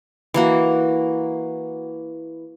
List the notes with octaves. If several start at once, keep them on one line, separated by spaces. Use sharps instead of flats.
E3 A#3 F#4